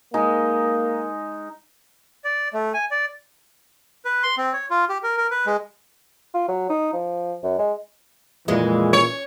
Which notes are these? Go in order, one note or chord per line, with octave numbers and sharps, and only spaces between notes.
G#3 A#3 D#4 G#4
D5
A3
G#5
D5
B4
C6
C4
C#5
F4
G4
A#4
A#4
B4
G#3
F4
F#3
D#4
F3
F#2
G#3
F2 A#2 E3 G#3
C#5